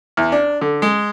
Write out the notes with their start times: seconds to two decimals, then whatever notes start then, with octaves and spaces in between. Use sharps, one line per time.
0.17 E2
0.32 D4
0.61 D3
0.82 G#3